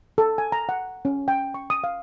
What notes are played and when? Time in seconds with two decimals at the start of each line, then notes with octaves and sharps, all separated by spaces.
0.18 A4
0.38 G#5
0.52 A#5
0.69 F#5
1.05 C#4
1.28 G5
1.54 C#6
1.70 D#6
1.84 F5